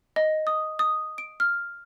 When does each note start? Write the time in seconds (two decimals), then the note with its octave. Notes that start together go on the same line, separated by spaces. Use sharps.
0.16 D#5
0.47 D#6
0.79 D#6
1.18 D7
1.40 F6